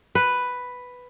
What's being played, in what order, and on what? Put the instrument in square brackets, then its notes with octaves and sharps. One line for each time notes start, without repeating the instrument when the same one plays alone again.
[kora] B4